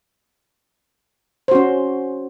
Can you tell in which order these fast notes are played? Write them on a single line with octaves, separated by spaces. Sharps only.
C5 F#4 C#4